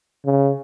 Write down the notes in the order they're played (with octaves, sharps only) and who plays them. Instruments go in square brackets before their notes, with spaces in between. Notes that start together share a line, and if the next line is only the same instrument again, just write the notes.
[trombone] C#3